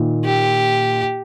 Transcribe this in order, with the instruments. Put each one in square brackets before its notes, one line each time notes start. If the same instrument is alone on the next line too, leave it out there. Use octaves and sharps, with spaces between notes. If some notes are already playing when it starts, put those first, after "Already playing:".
Already playing: [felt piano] A#2 D#3
[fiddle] G4